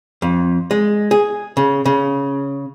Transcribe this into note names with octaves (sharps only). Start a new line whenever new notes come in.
F2
G#3
G#4
C#3
C#3